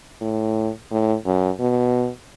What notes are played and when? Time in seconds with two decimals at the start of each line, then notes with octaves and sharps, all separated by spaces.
0.21 A2
0.91 A2
1.25 F#2
1.60 B2